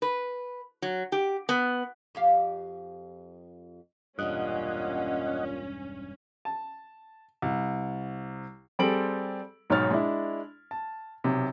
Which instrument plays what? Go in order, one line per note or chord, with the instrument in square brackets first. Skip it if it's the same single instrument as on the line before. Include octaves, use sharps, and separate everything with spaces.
[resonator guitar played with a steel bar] B4
F#3
G4
B3
[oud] F2 G4 F5
[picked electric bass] E1 G2 [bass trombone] A#2 [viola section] C#4 [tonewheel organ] D#5 F#5
[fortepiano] A5
C2
[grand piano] G3 C4 G#4 A4 D7 F#7
B1 G#2 D#4 C#5 F6 A6
G#3 D4 E4
A5
B1 C3